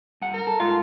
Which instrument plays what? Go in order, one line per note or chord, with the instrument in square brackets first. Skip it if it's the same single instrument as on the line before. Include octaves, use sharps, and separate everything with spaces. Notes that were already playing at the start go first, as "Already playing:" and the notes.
[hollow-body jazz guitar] G2 F#5
[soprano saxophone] A#4
[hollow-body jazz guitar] A4
[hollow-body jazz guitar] G#2 F5 [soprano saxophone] F4